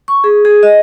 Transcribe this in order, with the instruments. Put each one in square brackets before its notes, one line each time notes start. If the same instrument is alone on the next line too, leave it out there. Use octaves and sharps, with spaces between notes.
[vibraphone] C#6
G#4
G#4
D#5